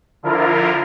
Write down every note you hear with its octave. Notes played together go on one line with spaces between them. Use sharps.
D3 F3 E4 F4 A#4